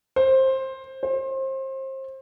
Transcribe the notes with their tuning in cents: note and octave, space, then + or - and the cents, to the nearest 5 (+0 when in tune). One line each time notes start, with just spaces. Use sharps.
C5 +15
C5 +30